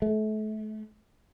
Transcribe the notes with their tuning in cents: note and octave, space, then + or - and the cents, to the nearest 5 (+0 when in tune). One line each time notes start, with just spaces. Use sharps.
A3 -35